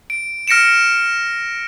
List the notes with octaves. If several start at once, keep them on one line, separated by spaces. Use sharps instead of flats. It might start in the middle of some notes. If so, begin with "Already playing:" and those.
D7
F6 A#6 C#7 D7 E7